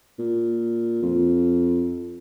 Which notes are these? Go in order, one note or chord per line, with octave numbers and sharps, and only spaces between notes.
A#2
F2